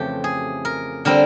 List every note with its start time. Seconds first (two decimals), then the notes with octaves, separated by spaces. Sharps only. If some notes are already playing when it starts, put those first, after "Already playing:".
Already playing: F2 C#3 E3 A3 C4 G4
0.24 G#4
0.65 A#4
1.05 D3 G3 C4 A#4